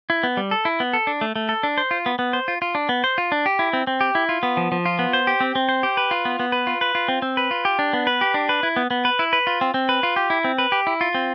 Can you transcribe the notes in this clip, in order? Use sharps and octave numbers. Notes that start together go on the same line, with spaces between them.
E4
B3
G3
A4
E4
B3
A4
D4
A3
A3
A4
D4
C5
F4
B3
B3
C5
F4
F4
D4
B3
C5
F4
D4
G4
E4
C4
C4
G4
E4
F4
B3
F3
F3
F4
B3
C5
G4
C4
C4
C5
G4
B4
F4
B3
B3
B4
F4
B4
F4
C4
C4
B4
F4
G4
D4
B3
B4
G4
D4
B4
E4
B3
B3
B4
E4
B4
F4
C4
C4
B4
F4
G4
E4
C4
B4
G4
E4
F4
C4